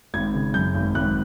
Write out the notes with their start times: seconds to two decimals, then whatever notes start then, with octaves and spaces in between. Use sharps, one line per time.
0.14 G#1 G#6
0.34 C#3
0.54 F#2 G6
0.75 G#1
0.95 G#1 F#6